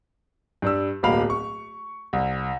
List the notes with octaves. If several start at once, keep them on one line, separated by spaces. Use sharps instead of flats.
G2 G3 E6
D1 B1 A#3 F5 B5 F7
C#6
C2